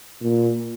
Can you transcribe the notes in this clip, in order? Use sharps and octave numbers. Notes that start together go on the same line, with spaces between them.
A#2